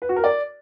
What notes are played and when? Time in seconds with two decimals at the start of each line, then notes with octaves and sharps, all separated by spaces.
0.02 B4
0.09 F#4
0.16 A#4
0.24 D5